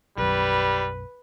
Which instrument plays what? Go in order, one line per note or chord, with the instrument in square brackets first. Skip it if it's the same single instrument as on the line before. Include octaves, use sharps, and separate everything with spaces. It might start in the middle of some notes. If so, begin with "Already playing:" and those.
[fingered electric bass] B1 F#2 [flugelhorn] G3 [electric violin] B4